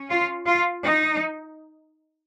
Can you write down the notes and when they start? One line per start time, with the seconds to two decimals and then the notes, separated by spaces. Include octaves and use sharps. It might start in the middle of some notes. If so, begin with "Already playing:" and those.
Already playing: C#4
0.10 F4
0.47 F4
0.86 D#4